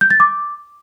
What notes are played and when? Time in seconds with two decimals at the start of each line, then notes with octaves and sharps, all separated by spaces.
0.01 G6
0.10 A6
0.20 D6